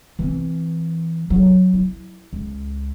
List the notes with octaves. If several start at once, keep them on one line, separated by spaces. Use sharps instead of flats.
E3 C4
F#3
E4
C#2